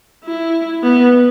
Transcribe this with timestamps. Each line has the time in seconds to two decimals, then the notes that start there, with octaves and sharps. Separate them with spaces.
0.24 E4
0.83 B3